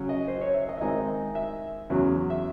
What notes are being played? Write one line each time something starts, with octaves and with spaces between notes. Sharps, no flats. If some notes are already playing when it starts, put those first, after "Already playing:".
Already playing: C#3 F#3 C#4
D#5
C5
C#5
E5
D#5
E5
D#3 G#3 C4 D#4 D#5
E5
E2 C#3 F#3
E5